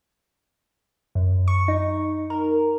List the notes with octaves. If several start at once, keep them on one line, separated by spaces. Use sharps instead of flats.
F#2
C#6
D#4
A#4